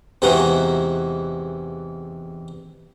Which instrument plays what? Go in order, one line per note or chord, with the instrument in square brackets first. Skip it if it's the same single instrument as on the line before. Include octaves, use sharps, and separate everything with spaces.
[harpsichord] E2 C3 E3 G#3 D#4 F#4